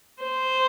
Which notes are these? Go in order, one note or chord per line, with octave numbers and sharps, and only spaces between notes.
C5